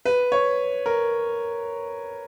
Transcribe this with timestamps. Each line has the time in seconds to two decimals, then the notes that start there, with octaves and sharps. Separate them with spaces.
0.05 B4
0.32 C#5
0.86 A#4